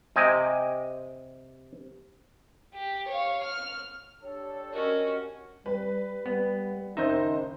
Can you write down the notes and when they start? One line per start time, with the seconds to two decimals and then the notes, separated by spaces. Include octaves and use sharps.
0.16 C3 D#5 G5 G#5
2.74 G4
3.08 C#5 F5
3.44 F6
4.22 D4 G4 A4 C#5
4.73 C#4 F#4 A#4 D#5
5.66 G3 B4
6.26 G3 B3
6.97 F#1 D#3 D#4 C5 E5 G6